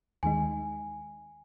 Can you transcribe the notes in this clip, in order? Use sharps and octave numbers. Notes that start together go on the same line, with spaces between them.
D#2 D#3 G#3 D#4 G#5